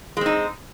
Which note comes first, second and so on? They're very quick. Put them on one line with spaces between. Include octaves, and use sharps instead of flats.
G#3 C4 D#4